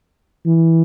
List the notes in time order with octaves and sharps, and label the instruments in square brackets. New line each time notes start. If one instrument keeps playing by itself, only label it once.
[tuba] E3